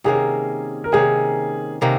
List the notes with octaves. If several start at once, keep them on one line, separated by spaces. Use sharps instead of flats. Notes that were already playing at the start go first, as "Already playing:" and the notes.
C3 D#3 A#3 C#4 G#4
A#4
C3 D#3 A#3 C#4 G#4
C3 D#3 A#3 C#4